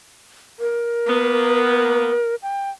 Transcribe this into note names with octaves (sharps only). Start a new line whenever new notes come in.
A#4
A#3 B3
G5